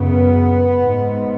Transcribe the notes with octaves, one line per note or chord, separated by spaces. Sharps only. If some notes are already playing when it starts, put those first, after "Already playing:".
Already playing: F#2 C#3 B3
G#2